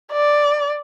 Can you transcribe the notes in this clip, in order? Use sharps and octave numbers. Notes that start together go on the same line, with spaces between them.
D5